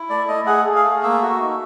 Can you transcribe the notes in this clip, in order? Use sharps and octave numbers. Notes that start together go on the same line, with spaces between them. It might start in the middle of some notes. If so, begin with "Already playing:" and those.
Already playing: E4
A3 D5
A3 D#5
G#4 F#5
G#4
F5
A3
A#3 E5
F#4
D#4